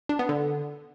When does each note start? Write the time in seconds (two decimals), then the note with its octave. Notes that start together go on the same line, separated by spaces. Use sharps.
0.09 D4
0.19 B3
0.29 D3